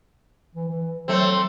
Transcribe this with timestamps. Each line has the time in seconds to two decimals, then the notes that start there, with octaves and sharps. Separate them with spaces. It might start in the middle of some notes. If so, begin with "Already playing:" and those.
0.55 E3
0.68 E3
1.08 F#3 A3 C4